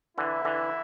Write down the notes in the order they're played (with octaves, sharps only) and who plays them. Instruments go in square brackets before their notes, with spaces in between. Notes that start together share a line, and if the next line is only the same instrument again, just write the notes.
[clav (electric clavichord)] D3 E3 [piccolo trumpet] E4
[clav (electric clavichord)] D3 E3